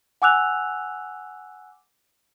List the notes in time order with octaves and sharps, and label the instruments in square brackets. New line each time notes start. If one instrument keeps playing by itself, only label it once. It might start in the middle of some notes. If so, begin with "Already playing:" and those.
[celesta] F#5 G#5 D6 E6 F#6 F7